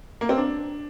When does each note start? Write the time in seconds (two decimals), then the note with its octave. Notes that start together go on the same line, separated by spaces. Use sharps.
0.21 A#3
0.29 C4
0.37 D4